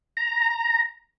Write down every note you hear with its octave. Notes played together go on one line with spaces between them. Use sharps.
A#5